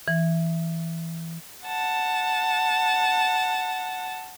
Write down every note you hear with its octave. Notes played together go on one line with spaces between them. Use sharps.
E3
F#5 A5